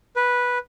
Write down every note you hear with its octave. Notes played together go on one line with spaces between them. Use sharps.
B4